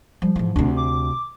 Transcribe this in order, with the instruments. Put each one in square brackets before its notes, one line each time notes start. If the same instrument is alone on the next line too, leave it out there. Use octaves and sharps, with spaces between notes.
[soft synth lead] F3 [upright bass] G3
[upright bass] G#2 E3
[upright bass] D2 C3 [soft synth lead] D4
[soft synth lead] D6